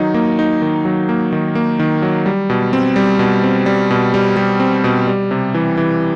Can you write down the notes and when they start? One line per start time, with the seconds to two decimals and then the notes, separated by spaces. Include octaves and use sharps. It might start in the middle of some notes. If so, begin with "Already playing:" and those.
Already playing: D#3 F#3 D#4
0.14 A#3
0.39 D#4
0.62 D#3
0.85 F#3
1.09 A#3
1.33 D#3
1.55 A#3
1.79 D#3
2.02 F#3
2.26 G3
2.50 B2
2.73 C4
2.96 G3
3.19 B2
3.43 C4
3.66 G3
3.91 B2
4.14 G3
4.37 G3
4.60 C4
4.84 B2
5.07 G3
5.31 C3
5.54 E3
5.77 E3